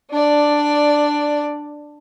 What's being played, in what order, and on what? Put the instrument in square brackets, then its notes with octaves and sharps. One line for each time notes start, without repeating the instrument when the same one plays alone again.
[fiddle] D4 D5